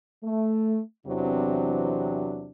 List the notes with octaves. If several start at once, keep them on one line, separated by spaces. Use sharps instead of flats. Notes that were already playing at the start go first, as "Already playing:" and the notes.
A3
E2 C3 E3 F#3 C4 D4